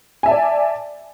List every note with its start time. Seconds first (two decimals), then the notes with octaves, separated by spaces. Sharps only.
0.23 G#5
0.26 E5
0.28 A5
0.31 D5